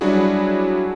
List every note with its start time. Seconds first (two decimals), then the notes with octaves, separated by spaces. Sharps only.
0.01 F#3 G3 D4 E4 F#4 G#4